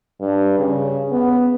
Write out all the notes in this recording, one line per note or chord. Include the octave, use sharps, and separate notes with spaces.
G2
C#3
B3